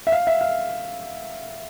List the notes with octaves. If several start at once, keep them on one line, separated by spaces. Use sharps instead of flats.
E5
F5
E5
F5